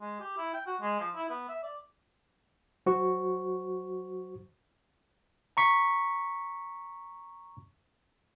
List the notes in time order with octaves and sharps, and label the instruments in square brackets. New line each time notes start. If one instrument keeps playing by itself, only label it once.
[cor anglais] G#3
G4
E4
G5
F#4
G#3
F3
E4
B3
E5
D5
[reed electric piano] F#3 F#4 C5 C#6
[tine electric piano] A#5 C#6 B6